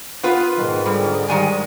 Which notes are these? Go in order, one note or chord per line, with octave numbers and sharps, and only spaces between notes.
B3 F4 B4
G#2 D#3
D3 G3
D#3 G3 G#3 G#5